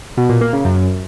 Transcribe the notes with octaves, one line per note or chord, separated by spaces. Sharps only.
B2
A#2
A#3
C#3
F#2